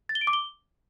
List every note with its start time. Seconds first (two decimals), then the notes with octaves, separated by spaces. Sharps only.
0.09 A6
0.15 G7
0.21 D7
0.27 D6
0.33 G7